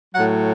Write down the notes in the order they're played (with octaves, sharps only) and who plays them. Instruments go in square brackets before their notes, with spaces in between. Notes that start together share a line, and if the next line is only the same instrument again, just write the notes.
[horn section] A2 F#3 F#5